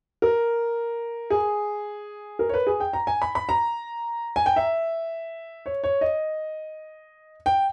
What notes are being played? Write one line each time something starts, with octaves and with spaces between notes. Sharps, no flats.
A#4
G#4
A#4
C#5
B4
G#4
G5
A#5
G#5
B5
B5
A#5
G#5
G5
E5
C#5
C#5
D#5
G5